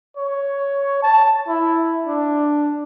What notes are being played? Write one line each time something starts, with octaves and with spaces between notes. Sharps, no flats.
C#5
A5
E4
D4